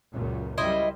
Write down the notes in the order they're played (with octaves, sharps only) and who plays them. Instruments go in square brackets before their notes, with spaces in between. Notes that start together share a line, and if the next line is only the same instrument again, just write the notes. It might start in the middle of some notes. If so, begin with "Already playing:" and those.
[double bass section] C#2 F#2 A#2
[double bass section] F#2 G3 [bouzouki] E4 C5 D#5